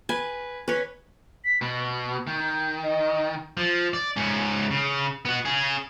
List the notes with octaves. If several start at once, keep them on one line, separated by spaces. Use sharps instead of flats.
B4 G#5
C#4 B4 C#5
B6
B2 B5
D#3 G6
D#5
F3
D5
G#2 C#4
C#3
B3 F#4
C#4 G#4